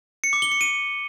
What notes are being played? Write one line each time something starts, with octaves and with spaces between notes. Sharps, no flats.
C#7
D6
G7
C#7
D#7